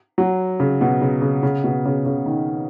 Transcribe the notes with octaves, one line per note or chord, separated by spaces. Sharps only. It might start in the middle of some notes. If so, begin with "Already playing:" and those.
F#3
C#3
B2
C#3
C#3
C#3
B2
C#3
C#3
D#3